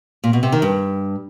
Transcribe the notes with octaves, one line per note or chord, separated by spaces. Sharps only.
A#2
B2
C3
D#3
G2